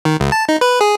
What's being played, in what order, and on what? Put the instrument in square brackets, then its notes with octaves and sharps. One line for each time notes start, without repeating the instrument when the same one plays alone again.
[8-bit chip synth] D#3
C#2
A5
D#4
B4
G#4